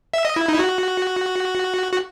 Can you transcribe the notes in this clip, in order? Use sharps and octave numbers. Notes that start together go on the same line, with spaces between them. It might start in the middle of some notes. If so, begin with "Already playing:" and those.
E5
D#5
E4
D#4
E4
F#4
F#4